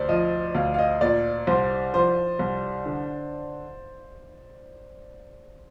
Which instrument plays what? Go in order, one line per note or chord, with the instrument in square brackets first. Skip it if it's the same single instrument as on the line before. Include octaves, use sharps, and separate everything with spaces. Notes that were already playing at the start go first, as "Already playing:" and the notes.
Already playing: [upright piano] D2 [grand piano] C5 D5
[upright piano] F3 [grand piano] D#5
[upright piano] D2 [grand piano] F5
[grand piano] F5
D#5
[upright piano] A#2 [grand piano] D5
[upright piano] C2 [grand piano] C5
[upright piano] F3 [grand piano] C5
[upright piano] C2
D3